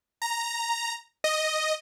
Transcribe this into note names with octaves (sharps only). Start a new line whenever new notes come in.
A#5
D#5